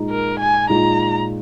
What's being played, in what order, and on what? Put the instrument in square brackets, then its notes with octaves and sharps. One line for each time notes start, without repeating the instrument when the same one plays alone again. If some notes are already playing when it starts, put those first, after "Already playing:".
Already playing: [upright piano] A#2 G#3 D#4
[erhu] A#4
G#5
[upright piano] A#2 G#3 D#4 [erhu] A#5